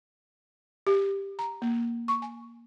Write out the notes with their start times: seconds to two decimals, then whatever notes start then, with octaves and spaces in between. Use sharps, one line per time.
0.87 G4
1.39 A#5
1.62 A#3
2.08 C#6
2.22 G#5